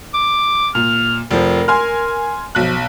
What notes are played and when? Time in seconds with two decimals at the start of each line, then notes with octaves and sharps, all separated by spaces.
0.14 D6
0.75 A#2 F6
1.31 F1 F3 A#4
1.68 G#5 C6 F6
2.55 B1 F3 F#6